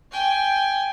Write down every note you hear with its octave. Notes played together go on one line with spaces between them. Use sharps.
G5 G#5